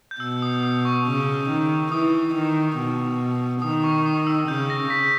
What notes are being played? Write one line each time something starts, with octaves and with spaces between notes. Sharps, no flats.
G6
B2 E6
D#6
D#6
C#6
C#3
D#3
E3 D#6
D#3
B2
D#3 D#6
C#6
D#6
E6
C#3 G6
A#6
B6